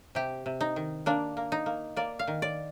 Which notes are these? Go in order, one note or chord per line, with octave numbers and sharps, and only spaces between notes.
C3 G4
C3
D#4
D#3
A#3 D4
A#3
D#4
A#3
A#3 D5
F5
D#3
D5